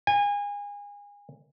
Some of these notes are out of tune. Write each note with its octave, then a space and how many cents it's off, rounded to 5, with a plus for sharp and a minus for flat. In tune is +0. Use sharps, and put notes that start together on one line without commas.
G#5 -30